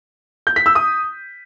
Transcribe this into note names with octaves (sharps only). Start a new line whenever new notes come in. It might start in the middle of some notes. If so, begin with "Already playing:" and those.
G6
B6
E6
D#6